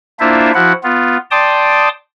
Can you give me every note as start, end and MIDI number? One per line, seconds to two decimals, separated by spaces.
0.20 0.51 58
0.20 0.51 62
0.20 0.51 64
0.20 0.51 65
0.20 0.51 72
0.20 0.51 76
0.54 0.73 53
0.54 0.73 64
0.54 0.73 66
0.54 0.73 78
0.83 1.17 59
0.83 1.17 65
1.31 1.89 74
1.31 1.89 79
1.31 1.89 81
1.31 1.89 84
1.31 1.89 86
1.31 1.89 87